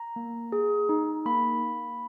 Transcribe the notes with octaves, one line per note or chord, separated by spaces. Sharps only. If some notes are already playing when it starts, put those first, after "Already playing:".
Already playing: A#5
A#3
G#4
D#4
A#3 B5